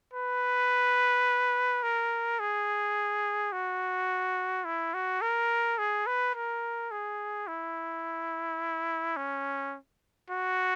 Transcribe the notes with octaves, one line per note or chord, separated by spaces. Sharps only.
B4
A#4
G#4
F#4
E4
F#4
A#4
G#4
B4
A#4
G#4
E4
C#4
F#4